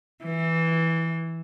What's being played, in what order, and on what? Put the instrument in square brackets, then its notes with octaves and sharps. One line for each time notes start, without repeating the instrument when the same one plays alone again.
[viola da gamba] E3